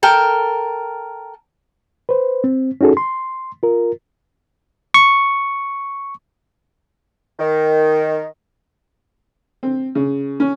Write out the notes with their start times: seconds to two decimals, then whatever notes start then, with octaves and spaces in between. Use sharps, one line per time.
0.03 A4 A#4 G5
2.09 B4 C5
2.44 C4
2.81 C#4 D#4 F#4 G#4 A4
2.97 C6
3.63 F4 A#4
4.94 C#6
7.39 D#3
9.63 C4
9.95 C#3
10.40 C#4